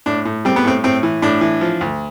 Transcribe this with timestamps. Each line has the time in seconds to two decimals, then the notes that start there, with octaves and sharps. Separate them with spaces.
0.06 A2 D4
0.25 A2
0.45 G3 C4
0.56 B3
0.65 A2 C4
0.84 A2 C4
1.03 E3
1.22 A2 D4
1.41 E3
1.61 F3
1.81 D2